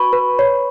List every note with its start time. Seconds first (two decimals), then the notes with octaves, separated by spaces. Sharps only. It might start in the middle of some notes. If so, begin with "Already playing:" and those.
Already playing: F#4 B4 B5 C#6
0.13 B4
0.39 C#5